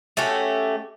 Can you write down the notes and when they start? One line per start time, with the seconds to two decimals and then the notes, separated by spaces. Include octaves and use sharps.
0.17 A3 C#4 F#4 G4